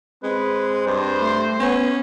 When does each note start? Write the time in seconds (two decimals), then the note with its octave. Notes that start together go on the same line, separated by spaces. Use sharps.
0.23 G#3 C4 B4
0.87 G2 C5
1.20 A3
1.59 B3 C#4